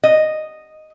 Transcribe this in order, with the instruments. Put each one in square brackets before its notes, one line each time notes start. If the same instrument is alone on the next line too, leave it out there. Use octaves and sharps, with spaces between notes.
[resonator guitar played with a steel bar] D#5